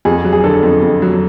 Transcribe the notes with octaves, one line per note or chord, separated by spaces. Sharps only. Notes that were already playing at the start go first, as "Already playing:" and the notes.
F2 G#4
F#3
G#4
D3 A4
F2
F2
F#3